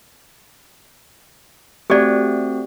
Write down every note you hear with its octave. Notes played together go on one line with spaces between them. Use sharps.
A3 C4 F#4 G4 D5